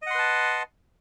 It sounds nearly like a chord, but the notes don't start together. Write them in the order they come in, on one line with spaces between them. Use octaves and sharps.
D#5 F#5 C6 B4 A5